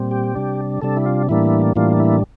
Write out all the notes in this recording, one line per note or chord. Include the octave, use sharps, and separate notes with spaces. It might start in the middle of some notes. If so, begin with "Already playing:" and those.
Already playing: A#2 G3 C4
G4
C3 G3 D4
C3 G3 D4 A4
E4
F4
A2 E3 G3 A#3 D4 E4
A2 E3 G3 A#3 D4 F4
E4